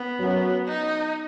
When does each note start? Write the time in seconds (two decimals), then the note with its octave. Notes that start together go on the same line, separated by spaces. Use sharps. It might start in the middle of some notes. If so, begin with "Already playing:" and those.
Already playing: B3
0.20 F#2 F#3
0.68 D#4